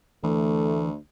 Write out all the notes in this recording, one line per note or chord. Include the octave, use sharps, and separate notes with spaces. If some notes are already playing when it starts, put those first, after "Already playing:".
D2 E3 A3